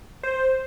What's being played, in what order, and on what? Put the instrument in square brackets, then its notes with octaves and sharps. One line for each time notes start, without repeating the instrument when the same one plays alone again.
[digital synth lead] C5